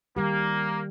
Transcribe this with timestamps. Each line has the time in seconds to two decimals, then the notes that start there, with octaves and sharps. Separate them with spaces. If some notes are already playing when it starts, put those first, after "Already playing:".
0.17 D#3 G3 A#3 G4